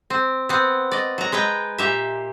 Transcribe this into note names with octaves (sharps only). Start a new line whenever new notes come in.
C4
B3 C4
D5 D#5
F#3 A#5
G#3 B4 G5 A#5
A#2 G4 E5